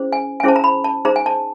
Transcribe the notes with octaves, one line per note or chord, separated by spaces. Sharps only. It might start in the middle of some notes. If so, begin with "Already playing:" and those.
Already playing: C#4 E4 G#4 C5
G#5
G#5
C#4 E4 G#4 C5 A5
A#5
B5
A5
D#4 G#4 C5 A#5
G#5
A5